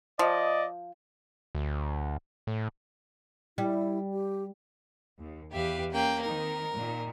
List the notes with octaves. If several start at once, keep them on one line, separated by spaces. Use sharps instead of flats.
F3 D5 D#5
D2
A2
G3 E4
G4
D#2
E2 G4 B4 E5 F5
A#3 C#4 G5
D#3 C4 D#4 A#4
A#2 D#3